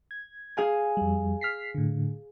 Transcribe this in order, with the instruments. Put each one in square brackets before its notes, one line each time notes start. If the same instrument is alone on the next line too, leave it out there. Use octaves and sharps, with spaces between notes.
[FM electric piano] G#6
[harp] G#4 F5 G#5
[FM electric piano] F2 G3
F6 B6 C7
A2 D3